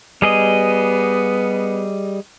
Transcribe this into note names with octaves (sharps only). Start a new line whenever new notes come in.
G3 B3 G#4 D#5